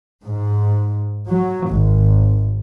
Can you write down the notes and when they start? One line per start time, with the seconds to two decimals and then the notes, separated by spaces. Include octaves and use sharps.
0.23 G#2
1.27 F#3
1.69 G#1